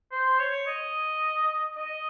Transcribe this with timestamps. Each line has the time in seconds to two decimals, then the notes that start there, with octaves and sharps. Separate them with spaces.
0.12 C5
0.39 C#5
0.67 D#5
1.77 D#5